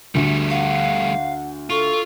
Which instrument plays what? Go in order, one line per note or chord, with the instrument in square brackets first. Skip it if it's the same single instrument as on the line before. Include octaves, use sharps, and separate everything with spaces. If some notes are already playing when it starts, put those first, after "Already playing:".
[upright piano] D2 [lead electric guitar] G3 A3
[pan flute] F5 [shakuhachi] F#5
[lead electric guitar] F4 [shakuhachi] A4 [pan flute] C#6